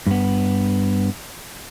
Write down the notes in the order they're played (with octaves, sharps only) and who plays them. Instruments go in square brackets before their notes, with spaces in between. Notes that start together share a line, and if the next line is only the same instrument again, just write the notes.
[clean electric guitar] G2 B3